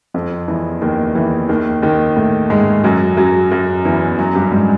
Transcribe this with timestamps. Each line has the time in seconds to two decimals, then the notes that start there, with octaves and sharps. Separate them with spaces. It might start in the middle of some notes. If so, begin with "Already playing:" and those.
0.14 F2 F3
0.48 E2 E3
0.82 D#2 D#3
1.15 E2 E3
1.49 D#2 D#3
1.82 D#2 D#3
2.17 A2 A3
2.50 G#2 G#3
2.84 F#2 F#3
3.17 F#2 F#3
3.51 F#2 F#3
3.85 E2 E3
4.19 F#2 F#3
4.35 G2 G3
4.52 G#2 G#3